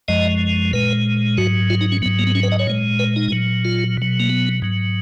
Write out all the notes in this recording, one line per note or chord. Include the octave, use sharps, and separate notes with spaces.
F#2 F3 G#3 D#5
A#2 G#3 B4
G#2 F#3 F#4
F4
D#4
C#4
G#2 F#3 B3
A#3
B3
C#4
B4
D#5
C#5
A#2 G#3
B4
D#4
A#2 F#3
F4
B2 F#3
A#3
B3
G#2 F#3